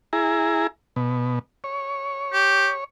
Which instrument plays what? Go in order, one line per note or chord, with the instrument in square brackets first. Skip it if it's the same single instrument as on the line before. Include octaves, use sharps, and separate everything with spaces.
[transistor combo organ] E4 G#4 A#5
B2
C#5
[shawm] G4